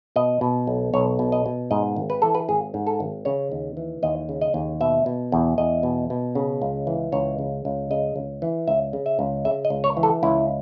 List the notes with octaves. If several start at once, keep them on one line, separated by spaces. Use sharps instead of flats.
B2 D#5
B2
B1
B1 C#5
B2
D#5
B2
G#2 D#5
G#1
B4
E3 A4
B4
G#1 G#4
G#2
A4
G#1
C#3 C#5
D#2
E3
D#2 D#5
C#3
D#5
D#2
B2 E5
B2
E2
E2 D#5
B2
B2
C#3
C#2
E3
C#2 C#5
C#3
C#2
C#3 D#5
C#2
E3
C#2 E5
C#3
E5
C#2
C#3 E5
D#5
C#2
C#5
E3
A4
C#2 E4